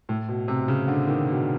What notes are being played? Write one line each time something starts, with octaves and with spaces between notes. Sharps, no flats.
A2
B2
C3
C#3
D3
D#3
B2